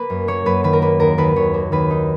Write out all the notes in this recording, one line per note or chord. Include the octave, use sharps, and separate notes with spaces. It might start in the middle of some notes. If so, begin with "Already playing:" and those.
Already playing: A#3 B4
F#2
A#3 C#5
F#2 B4
D#3 B4
A#4
A#3 B4
D#2 A#4
D#2 B4
D#2 C#5
A#3
D#2 B4
D#4